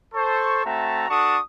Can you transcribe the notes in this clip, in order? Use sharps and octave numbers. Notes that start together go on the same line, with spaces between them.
A4 C5 C#6
A3 C4 F#4 E5 A5 A#5
D4 F#4 A4 A5 C#6 D#6